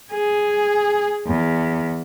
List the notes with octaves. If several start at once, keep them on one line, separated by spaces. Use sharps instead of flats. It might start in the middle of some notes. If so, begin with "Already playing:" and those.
G#4
E2